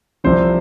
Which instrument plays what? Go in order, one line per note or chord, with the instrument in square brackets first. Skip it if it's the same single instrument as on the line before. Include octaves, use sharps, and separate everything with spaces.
[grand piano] C2 C3 F3 C5